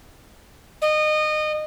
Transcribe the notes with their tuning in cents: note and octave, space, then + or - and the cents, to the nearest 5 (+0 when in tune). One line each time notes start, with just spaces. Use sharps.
D#5 -25